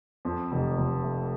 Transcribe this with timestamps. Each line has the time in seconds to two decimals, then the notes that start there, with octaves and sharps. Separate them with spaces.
0.25 F2
0.51 F1
0.77 F1
1.04 A3